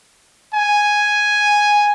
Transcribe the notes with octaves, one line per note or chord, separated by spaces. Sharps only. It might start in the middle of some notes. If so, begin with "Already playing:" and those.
G#5